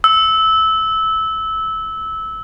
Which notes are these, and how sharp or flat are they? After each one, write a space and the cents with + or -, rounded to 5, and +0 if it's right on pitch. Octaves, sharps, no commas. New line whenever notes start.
E6 -15